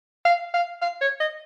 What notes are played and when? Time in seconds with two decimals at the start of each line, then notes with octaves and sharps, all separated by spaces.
0.25 F5
0.54 F5
0.82 F5
1.01 C#5
1.20 D#5